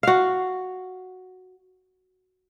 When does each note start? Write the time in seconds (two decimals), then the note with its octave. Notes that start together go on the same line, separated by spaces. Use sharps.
0.03 F#4 F5